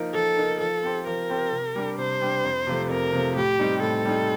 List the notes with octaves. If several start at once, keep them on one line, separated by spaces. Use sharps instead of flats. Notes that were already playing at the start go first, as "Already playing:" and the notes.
Already playing: F3 A#3 D#4 A#4
F3 A4
A#3 D#4 A#4
F3 A4
C4 G4 C5
F3 A#4
C4 G4 C5
C3
G3 D4 G4
C3 C5
G3 D4 G4
F2
C3 F3 A3
F2 A#4
C3 F3 A3
A2 G4
G3 C4 D#4
A2 A4
G3 C4 D#4